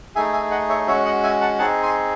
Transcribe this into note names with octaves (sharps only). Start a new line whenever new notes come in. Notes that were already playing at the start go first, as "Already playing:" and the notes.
A3 D#4 G#4 E5 G#5
E5 G#5
D#5 F#5
C#5 E5
G#3 C#4 F#4 C#5 E5
D#5 F#5
E5 G#5
F#5 A5
C4 D#4 G#4 F#5 A5
G#5 C6